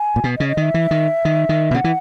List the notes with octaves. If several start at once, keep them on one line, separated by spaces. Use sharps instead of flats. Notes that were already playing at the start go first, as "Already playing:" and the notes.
Already playing: G#5
A#2
B2
D#5
C#3
D#5
D#3 E5
E3
D#3
D#3
D#3
B2
C#3 F#5
E3